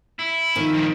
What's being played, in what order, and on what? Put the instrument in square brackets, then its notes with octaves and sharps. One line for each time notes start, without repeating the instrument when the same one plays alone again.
[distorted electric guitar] E4
[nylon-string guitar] D#3 F3
[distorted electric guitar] F2 A#2